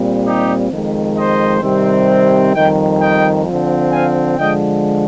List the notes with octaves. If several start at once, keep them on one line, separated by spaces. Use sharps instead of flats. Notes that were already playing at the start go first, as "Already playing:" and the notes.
Already playing: A#2 G3 C4
D#4 G4
F2 D#3 G#3
C5 D#5
C3 D#3 G3 C4
F2 D#3 G3 D#5 G5
D#5 G5
D3 F3 C4
F5 G#5
D3 F3 G#3 D#5 G5